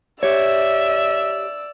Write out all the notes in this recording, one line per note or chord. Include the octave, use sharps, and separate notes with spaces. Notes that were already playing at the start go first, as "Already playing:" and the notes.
G4 C#5 D5 E5 E6